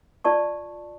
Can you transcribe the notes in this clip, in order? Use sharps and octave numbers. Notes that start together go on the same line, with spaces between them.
F4 D5 A5 C#6